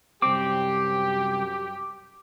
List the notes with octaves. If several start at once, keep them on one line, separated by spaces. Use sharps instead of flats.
C2 F#2 C4 G4 D6